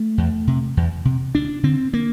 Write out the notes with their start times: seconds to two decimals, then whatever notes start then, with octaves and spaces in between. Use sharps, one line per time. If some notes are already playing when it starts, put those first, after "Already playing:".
Already playing: A3
0.18 E2
0.47 C3
0.77 E2
1.05 C3
1.35 D2 D4
1.63 D3 C4
1.94 A#3